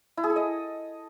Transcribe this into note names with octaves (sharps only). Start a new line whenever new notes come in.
E4
G#4
A4
D#5